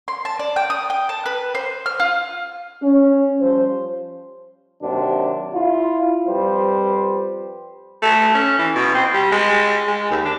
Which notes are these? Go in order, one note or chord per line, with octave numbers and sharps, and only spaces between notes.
C6
A5
D5
G5
D#6
G5
A5
B4
C5
F6
F4
C#4
F3 G3 C5
D#2 C3 F#3 D4
E4 F4
F2 G3 B4 C5
A3
C#4
E3
B2
C4
G3
G#3
G#3
D#2
D4